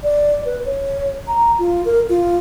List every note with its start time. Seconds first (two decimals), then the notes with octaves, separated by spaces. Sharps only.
0.03 D5
0.45 B4
0.65 C#5
1.27 A#5
1.59 F4
1.85 A#4
2.09 F4